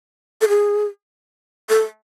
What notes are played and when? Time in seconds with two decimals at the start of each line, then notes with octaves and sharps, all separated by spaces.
0.41 A4
0.49 G#4
1.69 A4